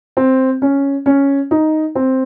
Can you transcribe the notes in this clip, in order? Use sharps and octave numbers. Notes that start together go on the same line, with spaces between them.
C4
C#4
C#4
D#4
C4